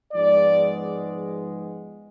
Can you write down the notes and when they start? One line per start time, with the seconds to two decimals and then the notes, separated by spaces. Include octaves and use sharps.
0.12 G#2 F3 G#3 B3 D5